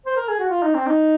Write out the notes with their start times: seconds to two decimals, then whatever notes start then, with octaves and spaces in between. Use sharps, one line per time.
0.06 C5
0.16 A#4
0.28 G#4
0.39 F#4
0.49 F4
0.63 D#4
0.75 C4
0.87 D#4